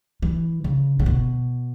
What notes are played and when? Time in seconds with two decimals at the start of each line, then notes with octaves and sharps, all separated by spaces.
0.22 E3
0.64 C#3
1.00 C#3
1.06 B2